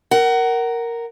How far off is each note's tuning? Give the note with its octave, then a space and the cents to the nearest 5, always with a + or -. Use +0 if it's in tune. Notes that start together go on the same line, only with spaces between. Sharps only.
A#4 +0 F#5 +25